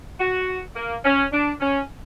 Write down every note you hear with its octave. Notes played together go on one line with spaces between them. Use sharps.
F#4
A#3
C#4
D4
C#4